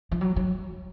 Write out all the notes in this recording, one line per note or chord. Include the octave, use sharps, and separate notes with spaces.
F3
F#3
F#3